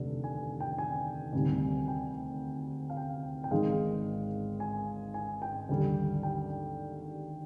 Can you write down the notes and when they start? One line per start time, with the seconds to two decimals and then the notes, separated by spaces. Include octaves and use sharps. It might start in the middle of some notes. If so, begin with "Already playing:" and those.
Already playing: F1 D#2 D3
0.24 G#5
0.60 G5
0.78 G#5
1.33 D2 C3 D#3 G3
1.88 G5
2.90 F5
2.97 G5
3.44 G5
3.51 G#1 G#2 D#3 G#3 F5
4.60 G#5
5.14 G#5
5.42 G5
5.69 D#2 D3 G3
6.23 G5